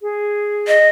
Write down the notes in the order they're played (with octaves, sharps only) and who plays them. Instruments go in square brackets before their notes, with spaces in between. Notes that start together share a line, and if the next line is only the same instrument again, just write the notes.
[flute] G#4
[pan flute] D#5